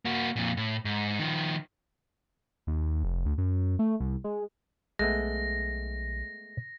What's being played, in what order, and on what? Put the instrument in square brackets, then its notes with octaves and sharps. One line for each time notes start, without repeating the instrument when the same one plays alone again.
[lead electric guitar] A#3 F#4
F2 A#2
A2
G#2
D#3 F3
[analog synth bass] D#2
F1
D2
F#2
A3
C2
G#3
[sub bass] B1 [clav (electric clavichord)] G#3 A3 B3 [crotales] A#6